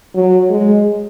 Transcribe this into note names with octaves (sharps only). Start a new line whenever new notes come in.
F#3
G#3